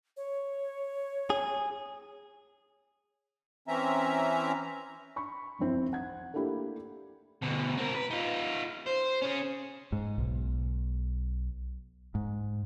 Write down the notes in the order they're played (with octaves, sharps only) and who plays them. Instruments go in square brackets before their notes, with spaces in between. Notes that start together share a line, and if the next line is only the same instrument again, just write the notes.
[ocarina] C#5
[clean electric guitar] G#4
[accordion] E3 C4 C#4 E5 A#5
[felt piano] B5 C#6
E1 B1 F2 C4 E4
F#5 G#6
A3 A#3 D4 E4 G4
[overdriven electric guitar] D2 B2
C4 A#4
B4
D#4 F4
C5
C#4 G#4
[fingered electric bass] G#2
B1
G#2